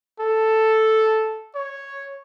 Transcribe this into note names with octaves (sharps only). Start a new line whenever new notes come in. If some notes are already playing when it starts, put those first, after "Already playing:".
A4
C#5